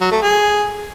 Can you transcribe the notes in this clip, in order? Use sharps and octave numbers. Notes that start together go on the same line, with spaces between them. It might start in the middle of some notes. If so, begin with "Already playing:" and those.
F#3
A3
G#4